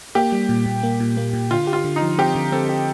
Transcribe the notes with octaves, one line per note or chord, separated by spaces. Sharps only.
A#3 G4
G3
A#2
A#2
A#3
A#2
A#3
A#2
D3 F4
G4
F4
D3
D#4
F3
C4 G4
D3
C4 A4
G4